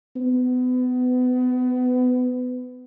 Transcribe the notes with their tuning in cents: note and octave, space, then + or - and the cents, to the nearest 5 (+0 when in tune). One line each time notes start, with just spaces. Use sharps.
B3 +30